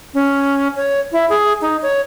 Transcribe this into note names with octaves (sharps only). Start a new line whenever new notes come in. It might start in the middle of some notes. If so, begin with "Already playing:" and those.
C#4
C#5
E4
G#4
D#4
C#5